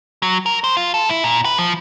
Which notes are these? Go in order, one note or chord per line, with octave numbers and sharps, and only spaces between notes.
F#3
A#4
C5
F4
A4
E4
A#2
B4
F3